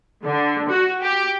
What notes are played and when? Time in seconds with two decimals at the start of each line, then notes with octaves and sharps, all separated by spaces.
0.25 D3
0.69 F#4
1.03 G4